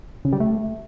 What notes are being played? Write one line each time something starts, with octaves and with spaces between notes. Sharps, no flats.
C#3
G3
A3